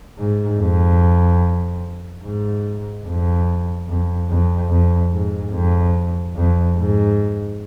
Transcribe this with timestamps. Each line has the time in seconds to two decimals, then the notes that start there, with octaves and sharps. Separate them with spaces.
0.18 G#2
0.59 F2
2.23 G#2
3.06 F2
3.88 F2
4.29 F2
4.70 F2
5.11 G#2
5.53 F2
6.36 F2
6.77 G#2